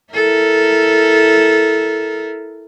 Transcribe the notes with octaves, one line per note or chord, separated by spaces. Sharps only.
E4 A4 A#4